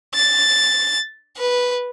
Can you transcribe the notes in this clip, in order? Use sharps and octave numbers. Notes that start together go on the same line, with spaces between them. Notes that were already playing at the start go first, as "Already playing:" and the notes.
A6
B4